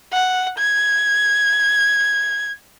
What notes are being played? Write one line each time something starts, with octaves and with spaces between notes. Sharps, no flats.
F#5
G#6